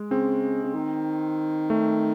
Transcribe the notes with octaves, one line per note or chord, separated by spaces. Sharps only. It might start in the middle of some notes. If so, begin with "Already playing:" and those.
Already playing: G#3
C#3 C4
C#3
D#3
A3